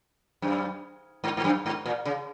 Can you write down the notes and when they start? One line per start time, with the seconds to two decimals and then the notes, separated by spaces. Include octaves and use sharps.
0.42 F#2
1.24 G#2
1.37 G#2
1.44 F#2
1.66 G#2
1.86 A#2
2.05 C#3